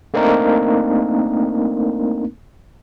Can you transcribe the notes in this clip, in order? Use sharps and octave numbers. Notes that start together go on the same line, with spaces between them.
A3 A#3 C4 D4 D#4 A#4